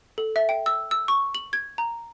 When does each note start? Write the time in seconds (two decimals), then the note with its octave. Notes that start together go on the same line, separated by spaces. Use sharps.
0.18 A4
0.36 E5
0.49 G5
0.66 E6
0.91 E6
1.08 C#6
1.35 F#7
1.53 G#6
1.78 A#5